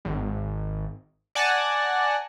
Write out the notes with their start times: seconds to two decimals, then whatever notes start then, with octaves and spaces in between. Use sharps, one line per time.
0.05 G#1
1.35 D5 F#5 G#5 A5 F#6 A#6